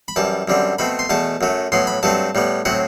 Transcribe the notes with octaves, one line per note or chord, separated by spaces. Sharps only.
B5
F#2 E3 G3 A5
F#2 D3 G3 C4
B2 A3 C4 B5
C6
E2 B2 A3 A5
F#2 F#3 A3
A2 F#3 B3 C6
B5
G2 F#3 A3 C4 A5
A2 G3 B3
A2 F#3 C4 F#5